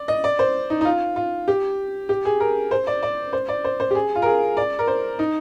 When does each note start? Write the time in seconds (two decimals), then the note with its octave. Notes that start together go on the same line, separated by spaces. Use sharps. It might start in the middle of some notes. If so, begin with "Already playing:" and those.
Already playing: D5
0.08 D#5
0.24 D5
0.39 C5
0.70 D#4
0.81 D#4
0.85 F4
1.16 F4
1.48 G4
2.09 G4
2.25 G#4
2.40 A#4
2.71 C5
2.87 D5
3.03 D5
3.33 C5
3.49 D5
3.64 C5
3.80 C5
3.91 G4
3.95 G#4
4.15 F4
4.22 A#4
4.26 G#4
4.57 D5
4.79 A#4
4.88 C5
5.19 D#4